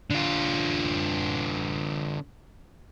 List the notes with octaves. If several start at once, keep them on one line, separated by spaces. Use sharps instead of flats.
D3 F4